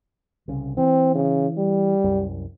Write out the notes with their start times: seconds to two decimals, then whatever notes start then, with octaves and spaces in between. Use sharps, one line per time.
0.48 C2 C#3
0.77 E3 C4
1.15 C#3
1.57 G3
2.04 C2 F#2